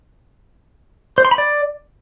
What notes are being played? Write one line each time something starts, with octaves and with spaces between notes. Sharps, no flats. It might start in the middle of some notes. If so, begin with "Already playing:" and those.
C5
C6
B5
D5